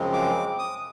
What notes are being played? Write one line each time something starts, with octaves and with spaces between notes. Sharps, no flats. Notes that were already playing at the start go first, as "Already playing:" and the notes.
Already playing: F#2 C#3 F3 G#3 C4
D6
D#6